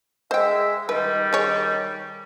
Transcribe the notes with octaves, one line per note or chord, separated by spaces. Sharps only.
G#3 C5 E5 G5
D#3 G3 B4
G#4 C#5